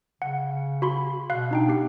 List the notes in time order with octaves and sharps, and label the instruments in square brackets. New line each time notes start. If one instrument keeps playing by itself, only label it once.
[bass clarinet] C#3 [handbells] F#5
[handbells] F#4 B5 C6
[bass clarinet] B2 [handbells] F5 F#6
[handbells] D4 D#4 G5
B3 G4 C7